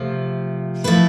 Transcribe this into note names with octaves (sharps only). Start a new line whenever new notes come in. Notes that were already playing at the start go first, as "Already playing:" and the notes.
Already playing: C3 F3 A3
F3 A3 E4 B4